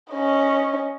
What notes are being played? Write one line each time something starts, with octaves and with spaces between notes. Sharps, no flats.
C#4 D#5